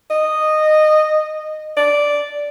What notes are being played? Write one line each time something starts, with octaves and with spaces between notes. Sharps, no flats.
D#5
D5